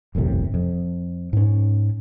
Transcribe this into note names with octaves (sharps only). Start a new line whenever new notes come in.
E1 A1 F#2 C3
F2
G#2 C#4